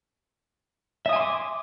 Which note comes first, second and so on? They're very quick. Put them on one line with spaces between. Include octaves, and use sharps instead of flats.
E5 D#6 G#5 C6 D6